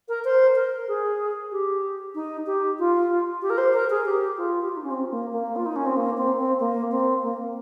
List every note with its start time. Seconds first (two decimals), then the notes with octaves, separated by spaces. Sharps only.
0.08 A#4
0.24 C5
0.55 A#4
0.88 G#4
1.52 G4
2.15 D#4
2.46 G4
2.79 F4
3.42 G4
3.50 A#4
3.58 C5
3.74 A#4
3.90 G#4
4.05 G4
4.37 F4
4.62 G4
4.69 F4
4.76 D#4
4.83 C#4
4.90 C4
5.11 A#3
5.32 A#3
5.56 F4
5.66 D#4
5.76 C#4
5.86 C4
5.96 A#3
6.17 C4
6.38 C4
6.60 A#3
6.91 C4
7.23 A#3